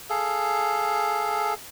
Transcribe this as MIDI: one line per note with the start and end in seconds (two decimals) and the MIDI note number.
0.10 1.54 68
0.10 1.54 69
0.10 1.54 77